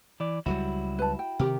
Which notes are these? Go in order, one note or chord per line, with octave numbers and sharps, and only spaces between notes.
E3 D5
C#2 F#3 G3 E4 F#4
B4 A5
G5
C3 D#3 G4 A#4